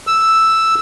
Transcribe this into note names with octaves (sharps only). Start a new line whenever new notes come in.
E6